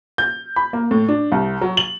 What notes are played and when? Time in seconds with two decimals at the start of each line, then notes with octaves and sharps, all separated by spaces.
0.18 G6
0.56 B5
0.73 A#3
0.91 A2
1.09 D4
1.32 C2
1.61 F#3
1.77 F#7